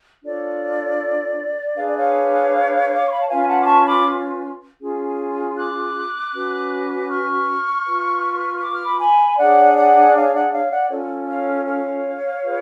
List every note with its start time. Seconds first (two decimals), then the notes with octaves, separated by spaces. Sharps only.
0.23 D4 F4 A4 C#5 D5
1.76 D4 G#4 B4 F5
1.87 D5
1.97 C#5 F5
2.96 D6
3.05 C#6
3.12 B5
3.20 A5
3.28 C#4 F4 B4 F5 G#5
3.48 F#5 A5
3.62 D6
3.66 A5 C#6
3.86 B5 D6
4.81 C#4 F4 G#4
5.57 D6 F#6
6.33 C#4 F#4 B4
7.09 C#6 F6
7.85 F4 B4
8.61 D6
8.73 F6
8.83 B5 D6
9.00 G#5 B5
9.38 D4 G#4 C#5 D5 F#5
9.76 D5 F#5
10.14 C#5 F5
10.33 D5 F#5
10.52 C#5 F5
10.70 D5 F#5
10.90 C#4 F4 A4 C#5
11.28 C#5 F5
11.66 C#5 F5
12.42 F4 G#4 B4